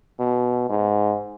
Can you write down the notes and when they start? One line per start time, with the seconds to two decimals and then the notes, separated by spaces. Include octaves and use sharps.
0.19 B2
0.69 G#2